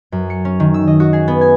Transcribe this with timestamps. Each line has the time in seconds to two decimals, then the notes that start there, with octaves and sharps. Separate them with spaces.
0.12 F#2
0.30 C#7
0.45 C#4
0.60 D#3
0.74 E6
0.87 D#5
1.00 F#4
1.13 G#4
1.28 B3
1.41 G#5